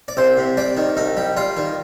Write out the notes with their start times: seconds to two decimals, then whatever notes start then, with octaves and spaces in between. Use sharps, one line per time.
0.08 D5
0.17 C2 C5
0.37 C3
0.57 G3 D5
0.77 D#3
0.97 C2 D#4
1.17 G3
1.37 G3 F4
1.57 D#3